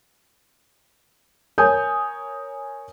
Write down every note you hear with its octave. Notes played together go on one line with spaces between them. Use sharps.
A#4 C#5 G#5 D#6 G6